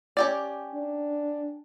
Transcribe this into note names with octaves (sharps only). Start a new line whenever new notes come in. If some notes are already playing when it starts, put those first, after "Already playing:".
C#4 G4 D5
D4